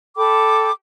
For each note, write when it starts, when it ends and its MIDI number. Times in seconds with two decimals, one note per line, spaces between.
0.18 0.71 69
0.18 0.71 79
0.18 0.71 83
0.18 0.71 86